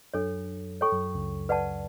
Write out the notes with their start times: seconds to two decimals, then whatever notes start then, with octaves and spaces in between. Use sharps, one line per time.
0.14 F#2 F#3 D4 A4 C#5
0.81 A4 C#5 G5 C#6
0.92 F#2 F#3
1.15 C#2 C#3
1.49 B4 D5 F#5 A5